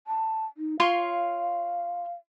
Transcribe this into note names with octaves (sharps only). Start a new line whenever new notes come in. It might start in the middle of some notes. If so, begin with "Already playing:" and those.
A5
D#4
F4 C#5 F5 C6